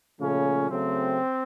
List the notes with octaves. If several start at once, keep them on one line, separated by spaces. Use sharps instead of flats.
A#2 C#3 F3 A3 C#4
C#3 F#3 A3 C4